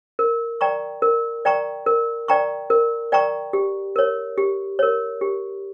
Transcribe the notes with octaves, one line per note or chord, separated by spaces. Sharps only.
A#4
D5 G5 A#5 C#6
A#4
D5 G5 A#5 C#6
A#4
D5 G5 A#5 C#6
A#4
D5 G5 A#5 C#6
G4
A#4 C#5
G4
A#4 C#5
G4